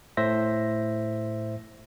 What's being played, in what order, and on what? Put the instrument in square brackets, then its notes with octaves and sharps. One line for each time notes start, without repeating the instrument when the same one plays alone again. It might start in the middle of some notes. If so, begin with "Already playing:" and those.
[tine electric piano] A2 C5 E5 A#6